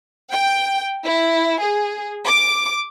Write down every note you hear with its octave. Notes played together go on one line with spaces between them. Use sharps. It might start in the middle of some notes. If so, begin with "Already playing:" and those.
G5
E4
G#4
D6